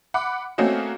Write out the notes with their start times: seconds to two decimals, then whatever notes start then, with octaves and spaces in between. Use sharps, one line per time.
0.14 F#5 B5 D6
0.58 A3 A#3 C4 C#4 F#4 D#5